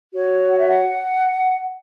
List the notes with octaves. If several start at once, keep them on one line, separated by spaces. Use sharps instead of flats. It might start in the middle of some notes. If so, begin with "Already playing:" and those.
F#4 C#5
F#5
E5
F#5